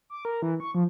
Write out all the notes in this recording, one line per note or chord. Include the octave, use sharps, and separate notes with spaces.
D6
A#4
E3
C#6
F3